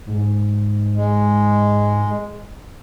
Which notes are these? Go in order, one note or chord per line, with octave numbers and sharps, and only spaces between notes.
G#2
G#3